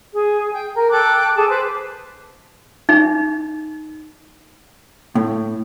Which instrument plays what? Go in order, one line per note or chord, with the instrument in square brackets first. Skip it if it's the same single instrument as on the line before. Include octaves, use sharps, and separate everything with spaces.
[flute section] G#4
G5
A#4
A4 G5 D6 F#6
G#4 A4 A5
B4 C5 D6
[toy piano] D#4
[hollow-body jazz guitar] A2